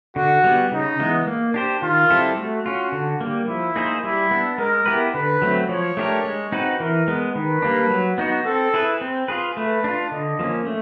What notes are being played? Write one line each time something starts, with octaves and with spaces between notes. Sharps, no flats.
D3 F#4
G3 B3
C#3 D#4
E3 G#3 B3
A#3
D4 G4 C5
D#3 F4
G3 C4 E4 A4
A3 F#4
C#4 F4
D3
G3 A#3
F3 E4
A#3 D#4 G#4 C5
G3 E4
B3 D4
G#3 A#4
B3 E4 G4 B4
D3 B4
F#3 A3 C4
F3 C#5
A3 D4 G4 A#4
G#3
C4 D#4 F#4 B4
E3 A#4
G#3 B3
D#3 B4
G3 A#3 D4
F#3
B3 D#4 F#4
C4 A4
E4 G#4 B4
C4
F4 G#4 B4
A3 B4
D4 F4
D3 D#5
F3 A#3 C#4
A3